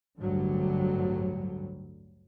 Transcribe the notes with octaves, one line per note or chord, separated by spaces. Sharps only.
A1 D2 G2 D3 F#3 G3